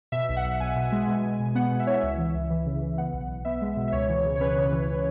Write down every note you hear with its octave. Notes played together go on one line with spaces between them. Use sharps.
B2 E5
B1
F#5
B1
B1 G#5
B2
G#3
B2
B2
B2
B3 F#5
B2
E5
E4 C#5
E5
C#2
E3
C#2
E3
C#3
E3
B3 F#5
B1
F#5
B1
B3 E5
G#3
B2
E5
C#2 C#5
E3
C#3
C#5
C#4 B4
C#3
E3